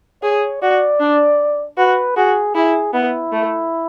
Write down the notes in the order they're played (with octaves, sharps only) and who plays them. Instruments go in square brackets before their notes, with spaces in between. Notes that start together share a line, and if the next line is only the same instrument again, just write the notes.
[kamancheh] G#4 [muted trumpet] C#5
[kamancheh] F#4 [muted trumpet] D5
[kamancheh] D4
[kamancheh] F#4 [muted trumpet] B4
[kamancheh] F#4 [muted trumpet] G#4
[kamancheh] E4 [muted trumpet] G#4
[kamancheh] B3 [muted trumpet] E4
[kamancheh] A3